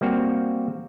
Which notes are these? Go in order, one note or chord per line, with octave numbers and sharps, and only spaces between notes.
G3 A#3 C4 F#4 F5